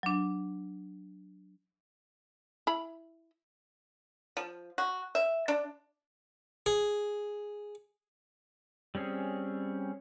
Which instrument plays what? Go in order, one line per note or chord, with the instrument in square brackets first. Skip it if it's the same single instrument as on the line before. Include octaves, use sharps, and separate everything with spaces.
[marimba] F#3 D4
[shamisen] E4 B5
[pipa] F3
F#4
E5
D4
[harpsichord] G#4
[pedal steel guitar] G3 C4 C#4 G#4